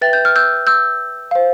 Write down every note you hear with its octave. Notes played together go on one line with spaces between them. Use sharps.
B4 E5 G5 A6
G6
F6
E6 G6
E6 G6
C5 F5